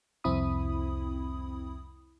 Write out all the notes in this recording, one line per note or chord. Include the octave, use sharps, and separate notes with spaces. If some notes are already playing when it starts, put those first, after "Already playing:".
C2 F2 C4 E4 B5 D#6